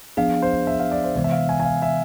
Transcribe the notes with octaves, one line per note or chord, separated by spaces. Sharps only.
F3 B3 D4 G#4 F5
C5
E5
F5
D5
C5
C3 E3 G#3 B3 C5
E5
F5
G#5
G#5
F5
E5